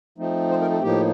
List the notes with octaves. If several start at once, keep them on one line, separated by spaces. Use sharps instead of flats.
F3 A3 C4 D#4
C5
A#4
A4
A2 F3 A#3 D#4 G4